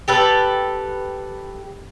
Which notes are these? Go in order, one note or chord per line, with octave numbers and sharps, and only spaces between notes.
G4 A4 B4